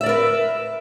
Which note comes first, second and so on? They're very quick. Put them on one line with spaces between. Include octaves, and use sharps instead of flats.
E5 D5 A#4 B4